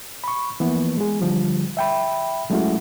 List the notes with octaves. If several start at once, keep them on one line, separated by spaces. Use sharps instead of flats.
B5 C#6
E3 F3 A#3 B3
G#3 G#4
D3 F3 G3
E5 G5 B5
F#3 G#3 A3 C#4 E4 F#4